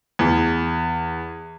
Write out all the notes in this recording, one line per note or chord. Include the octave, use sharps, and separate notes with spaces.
E2